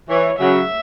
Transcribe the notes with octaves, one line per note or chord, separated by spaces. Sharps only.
E3 C#5
C#3 F#3 E5